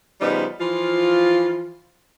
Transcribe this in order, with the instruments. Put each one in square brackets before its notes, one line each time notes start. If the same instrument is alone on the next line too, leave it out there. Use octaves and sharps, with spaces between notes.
[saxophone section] C#3 F3 G3 B3 D#4
E3 F3 F4